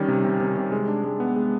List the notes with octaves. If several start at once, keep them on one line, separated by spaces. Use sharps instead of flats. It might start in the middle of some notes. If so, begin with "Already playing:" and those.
Already playing: D#3 G3 C#4
C3
C3
C3
C3
G#3
D4
G#3
B3
G#3